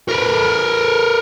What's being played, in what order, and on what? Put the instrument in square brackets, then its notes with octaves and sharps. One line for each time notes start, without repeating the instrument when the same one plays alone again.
[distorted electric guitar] A#4 B4